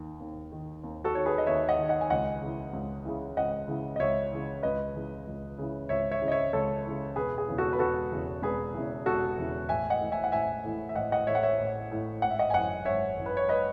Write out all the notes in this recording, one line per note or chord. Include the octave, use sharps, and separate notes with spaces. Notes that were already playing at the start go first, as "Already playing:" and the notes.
Already playing: D#2 D#3
D#2
D#3
D#2
F#4 A4
D#3 C#5
G#4 B4
D#5
D#2 C#5 E5
E5
D#5 F#5
D#3
D#5 F#5
G#5
C#2 D#5 F#5
C#3 E3
C#2
C#3 E3
C#2 D#5 F#5
C#3 E3
D#5
C#2 C#5 E5
C#3 E3
C#2 B4 D#5
C#3 E3
C#2
C#3 E3
C#2 C#5 E5
C#5 E5
C#3 E3
D#5
C#5 E5
C#2 A4 C#5
C#3 E3
E1 G#4 B4
G#4
E2 C#3 E3
F#4 A4
B4
E1 F#4 A4
E2 C#3 E3
E1 G#4 B4
E2 C#3 E3
E1 F#4 A4
E2 C#3 E3
A1 E5 G#5
D#5 F#5
A2 E3
E5 G#5
F#5
A1 E5 G#5
A2 E3
E5
A1 D#5 F#5
D#5 F#5
A2 E3 C#5 E5
F#5
C#5 E5
A1
A2 E3
G#1 F#5
E5
D#5 F#5
G#5
F#2 E3 D#5 F#5
G#1 C#5 E5
F#2 E3
B4
C#5
B4 D#5